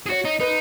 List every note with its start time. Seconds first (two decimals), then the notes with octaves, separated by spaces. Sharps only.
0.06 G#4
0.10 F#4 C#5
0.25 D#4
0.40 D#4 B4